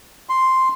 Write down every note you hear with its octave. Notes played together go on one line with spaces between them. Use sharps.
C6